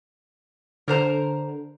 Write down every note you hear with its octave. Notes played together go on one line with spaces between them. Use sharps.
D3 A#4 C5 A#5